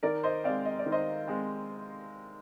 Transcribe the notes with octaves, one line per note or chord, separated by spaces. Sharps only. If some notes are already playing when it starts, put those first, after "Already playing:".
D#3 A#4 D5
C5 D#5
G#3 C4 D5 F5
D#5
D5
D#3
C5 D#5
G#3 C4